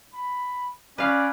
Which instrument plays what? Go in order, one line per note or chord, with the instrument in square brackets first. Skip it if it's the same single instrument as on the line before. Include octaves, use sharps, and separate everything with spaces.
[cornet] B5
[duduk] C#4 [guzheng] B4 F5 [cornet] D5